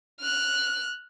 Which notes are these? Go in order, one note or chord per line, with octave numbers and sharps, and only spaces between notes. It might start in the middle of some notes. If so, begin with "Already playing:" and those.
F6 F#6